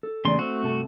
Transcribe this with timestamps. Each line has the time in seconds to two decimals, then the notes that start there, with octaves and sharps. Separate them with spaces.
0.03 A4
0.25 E2 C#3 A3 D5 C6
0.39 A3 C4 F#4
0.62 G2 C3 A4